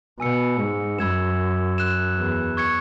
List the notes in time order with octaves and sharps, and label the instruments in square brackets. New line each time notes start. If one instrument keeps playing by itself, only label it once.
[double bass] B2 [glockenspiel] G#5 E6 C#7
[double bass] G#2
[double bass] F#2 [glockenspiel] B5 E6 G#6 E7
[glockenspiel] F#6 E7
[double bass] E2
[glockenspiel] C#6 G#6 C#7